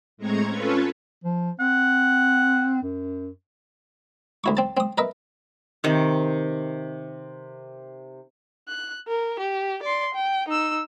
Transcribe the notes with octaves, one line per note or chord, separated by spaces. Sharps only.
A2 G#3 C4 A#5 C#6 G#6
C#4 F4 A4 B4 C#5
F3
C4 F#5
F#2
D2 E4 C#6
C4 A5
C4 D#6
A#4 B4 D#5 E5
C3 D#3
F#6
A#4
G4
D5 C6
G5
D#4 E6